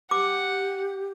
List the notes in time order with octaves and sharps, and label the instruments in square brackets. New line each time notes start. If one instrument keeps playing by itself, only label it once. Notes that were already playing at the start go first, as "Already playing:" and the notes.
[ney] G4 [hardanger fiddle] F#5 [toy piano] D6